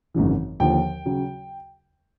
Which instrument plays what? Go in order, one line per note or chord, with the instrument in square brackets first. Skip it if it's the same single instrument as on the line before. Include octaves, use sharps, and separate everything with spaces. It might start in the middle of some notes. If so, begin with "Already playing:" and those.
[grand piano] G#1 F#2 C#3 E3
D#2 D3 F3 G5
C#3 F#3